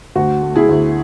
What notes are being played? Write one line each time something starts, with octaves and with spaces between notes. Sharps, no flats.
D2 F#4
A3
E4 G#4
D2